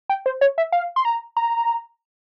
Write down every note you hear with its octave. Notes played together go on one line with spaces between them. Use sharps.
G5
C5
C#5
E5
F5
C6
A#5
A#5